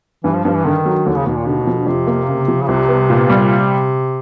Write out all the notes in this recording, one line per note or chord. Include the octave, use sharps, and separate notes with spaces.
G2 E3
F3
G2 F3
E3
D3 D#3
F#3
D#2 D3
C#3
D#2 B2
A#2
B2 D3
F3
F2 C3
A#3
C#3
F3
C#3
C2 C3
B3
A#2
G3